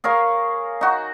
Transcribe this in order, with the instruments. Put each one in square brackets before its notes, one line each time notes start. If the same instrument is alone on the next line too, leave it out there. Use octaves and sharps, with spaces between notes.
[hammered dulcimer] G#4 A#4 C#5 F5
D#4 F#4